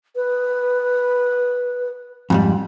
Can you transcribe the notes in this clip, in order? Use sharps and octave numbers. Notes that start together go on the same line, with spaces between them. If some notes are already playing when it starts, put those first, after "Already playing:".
B4
F2 G#2 G3